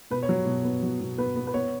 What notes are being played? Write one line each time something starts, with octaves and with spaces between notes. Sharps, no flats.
B2 B4
C#5
F#3
B2
B3
F#3
B2
B3 B4
B3
B4
B3 C#5